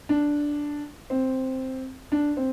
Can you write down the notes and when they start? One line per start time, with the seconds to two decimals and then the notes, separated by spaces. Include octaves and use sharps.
0.09 D4
1.10 C4
2.12 D4
2.37 C4